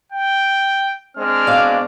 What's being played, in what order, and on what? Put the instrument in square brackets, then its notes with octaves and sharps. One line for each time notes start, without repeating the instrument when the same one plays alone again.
[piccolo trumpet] G5
[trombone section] G#3 C4 D4 [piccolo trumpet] F6
[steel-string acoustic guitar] B2 D5 F5